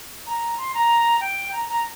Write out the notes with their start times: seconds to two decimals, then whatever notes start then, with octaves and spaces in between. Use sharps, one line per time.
0.26 A#5
0.58 C6
0.74 A#5
1.20 G5
1.53 A#5
1.69 A#5